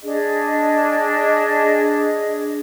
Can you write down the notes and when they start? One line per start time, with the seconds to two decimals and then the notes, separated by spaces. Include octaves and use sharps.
0.03 D4 G#4 D#5